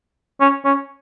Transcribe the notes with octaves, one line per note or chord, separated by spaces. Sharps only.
C#4
C#4